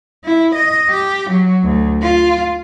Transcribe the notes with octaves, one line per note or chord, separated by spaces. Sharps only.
E4
D#5
G4
F#3
D2
F4